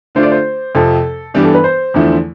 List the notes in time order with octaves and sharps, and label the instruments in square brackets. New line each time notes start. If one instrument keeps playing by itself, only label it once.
[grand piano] D3 A3 D4 F4 [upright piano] C5
[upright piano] D5
C5
[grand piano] F2 C3 F3 [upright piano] A4
[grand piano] G2 E3 G3 B3 D4 [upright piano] G4
[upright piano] A4
B4
C5
[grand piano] E2 D3 F3 A3 E4